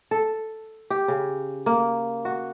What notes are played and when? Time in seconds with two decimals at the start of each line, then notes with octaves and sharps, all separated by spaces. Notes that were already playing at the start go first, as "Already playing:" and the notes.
0.11 A4
0.90 G4
1.08 C#3
1.66 A#3
2.25 F#4